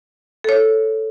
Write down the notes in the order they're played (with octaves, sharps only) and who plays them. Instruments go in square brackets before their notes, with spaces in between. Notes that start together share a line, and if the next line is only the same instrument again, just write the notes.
[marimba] A4 C#5